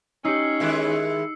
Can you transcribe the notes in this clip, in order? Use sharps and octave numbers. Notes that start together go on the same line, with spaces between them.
C#4 D#4 G4 E6 C7 C#7
D#3 G#3 E4